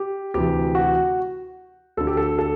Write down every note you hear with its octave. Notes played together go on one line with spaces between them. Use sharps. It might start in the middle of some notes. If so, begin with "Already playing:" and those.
Already playing: G4
D2 C3 E3 G4
F#4
D2 D3 A4
G4
A4
A4